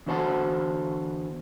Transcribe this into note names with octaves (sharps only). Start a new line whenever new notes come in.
E2 D3 F#4 C5 F#5 A5